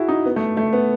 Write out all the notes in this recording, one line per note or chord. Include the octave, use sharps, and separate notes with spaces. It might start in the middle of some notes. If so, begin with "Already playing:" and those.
Already playing: E4 F#4 G#4
D#4
B3
A3
A3
B3